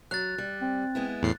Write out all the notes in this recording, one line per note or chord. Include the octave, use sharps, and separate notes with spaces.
F#3 F#6 A6
G3
C4
G#3 B3 E4
E2 A2 C7